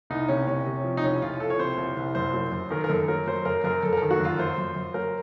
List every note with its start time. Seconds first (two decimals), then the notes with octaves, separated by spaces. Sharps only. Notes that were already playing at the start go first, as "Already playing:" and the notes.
0.10 C2 D#4
0.28 C3 C#4
0.47 C3 C#4
0.66 C3
0.84 F3
0.97 D#4
1.04 C2 C#4
1.22 C2 F4
1.40 F3 A4
1.50 C#5
1.59 C3 C5
1.77 C2
1.97 C2
2.15 F#2 C5
2.34 F#3
2.52 F#2
2.70 D#3 A#4
2.84 A#4
2.89 F#2 A4
3.08 F#3 A#4
3.27 F#3 C5
3.45 F#2 A#4
3.64 F#2 A#4
3.83 F#2 A4
3.93 A#4
3.97 D#3 A4
4.11 F#4
4.20 F#2
4.25 F4
4.39 F#2 C5
4.58 F#2
4.76 F#2
4.94 F#3 A#4